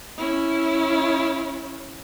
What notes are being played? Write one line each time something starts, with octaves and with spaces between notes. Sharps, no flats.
C#4 E4